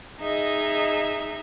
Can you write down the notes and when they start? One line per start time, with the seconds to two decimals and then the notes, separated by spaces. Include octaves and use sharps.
0.20 D#4 G#4 D#5 E5